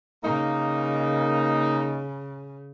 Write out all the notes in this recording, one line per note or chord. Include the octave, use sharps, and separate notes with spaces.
C#3 A#3 D#4